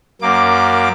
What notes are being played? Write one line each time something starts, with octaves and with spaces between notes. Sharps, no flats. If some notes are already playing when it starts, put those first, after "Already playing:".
F#2 A#3 D6